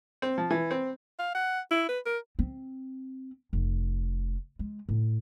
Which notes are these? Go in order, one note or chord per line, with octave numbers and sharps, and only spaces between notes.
C4
F3
E3
C4
F5
F#5
E4
B4
A#4
C4
F1
G#3
A2